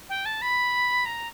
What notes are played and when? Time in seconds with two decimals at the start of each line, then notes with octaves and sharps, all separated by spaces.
0.09 G5
0.25 A5
0.42 B5
1.06 A#5